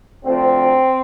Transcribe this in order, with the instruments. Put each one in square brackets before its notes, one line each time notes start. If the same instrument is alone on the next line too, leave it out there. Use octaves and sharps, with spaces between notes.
[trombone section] D2 D3 F3 C4